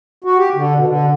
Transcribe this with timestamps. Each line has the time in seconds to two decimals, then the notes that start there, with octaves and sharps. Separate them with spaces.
0.24 F#4
0.38 G4
0.55 D3
0.76 B2
0.87 D3